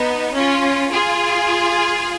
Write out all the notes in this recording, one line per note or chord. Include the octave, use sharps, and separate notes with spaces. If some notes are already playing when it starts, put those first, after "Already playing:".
Already playing: B3 D#4
C#4 F4
F4 G#4